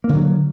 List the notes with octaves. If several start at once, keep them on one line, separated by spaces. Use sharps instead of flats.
D3 F#3 A#3